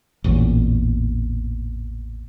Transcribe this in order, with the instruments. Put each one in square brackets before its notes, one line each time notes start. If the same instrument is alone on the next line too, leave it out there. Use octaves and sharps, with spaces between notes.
[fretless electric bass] A1 E2 A#2